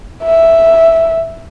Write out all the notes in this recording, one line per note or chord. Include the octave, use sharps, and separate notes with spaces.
E5